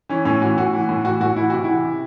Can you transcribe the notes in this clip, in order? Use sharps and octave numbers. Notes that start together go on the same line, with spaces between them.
E3 C#4
A2 C#4
E3 F#4
A2 F#4
E3
A2
E3 F#4
A2 F#4
E3 E4
C3 F#4
E3 E4
C3